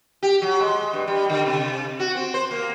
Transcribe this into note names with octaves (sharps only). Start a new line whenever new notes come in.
G4
F#3
G#3
G2
G3
D3
C3
F#4
C4
C5
A#3